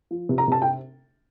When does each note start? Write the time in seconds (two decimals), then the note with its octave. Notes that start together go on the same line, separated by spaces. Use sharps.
0.11 F3
0.29 C3
0.38 A#5
0.48 C3 A5
0.62 G5